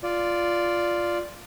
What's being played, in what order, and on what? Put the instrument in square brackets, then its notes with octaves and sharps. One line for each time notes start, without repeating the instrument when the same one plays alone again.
[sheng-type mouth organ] F4 D5